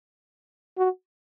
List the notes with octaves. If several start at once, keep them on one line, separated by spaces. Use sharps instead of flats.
F#4